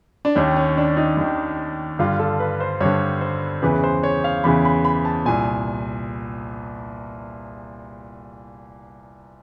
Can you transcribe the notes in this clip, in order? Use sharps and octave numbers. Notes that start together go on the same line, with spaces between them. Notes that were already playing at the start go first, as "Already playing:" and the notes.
D4
D#2 D#3 C#4
C#4
D4
D#4
D#2 D#3
G2 D3 F4
A4
B4
C5
G2 D3 C#5
C5
E2 C#3 E3 B4
C5
C#5
F5
E2 C#3 E3 B5
B5
B5
A5
C2 A#2 G#5